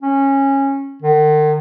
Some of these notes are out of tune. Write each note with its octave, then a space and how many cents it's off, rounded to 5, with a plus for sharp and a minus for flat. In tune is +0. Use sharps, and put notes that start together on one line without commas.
C#4 -15
D#3 -45